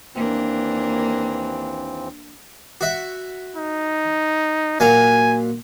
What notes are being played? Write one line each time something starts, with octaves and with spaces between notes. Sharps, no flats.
D#2 E3 A#3 C4 D4
F#4 E5
D#4
A#2 F#3 F5 G#5